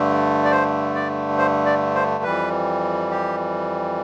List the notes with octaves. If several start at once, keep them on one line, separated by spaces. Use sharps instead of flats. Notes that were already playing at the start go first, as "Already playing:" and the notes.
Already playing: G2 D3 A3
D5
C5
D5
C5
D5
C5
F2 E3 G3 B4
G4